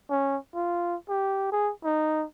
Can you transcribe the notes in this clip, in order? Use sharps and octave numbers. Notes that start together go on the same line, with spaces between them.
C#4
F4
G4
G#4
D#4